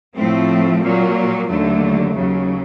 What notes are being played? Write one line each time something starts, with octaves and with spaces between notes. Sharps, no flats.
A2 F3 A3 C4
A#2 F#3 A#3
D#2 D3 F#3 A3
D#2 C#3 F#3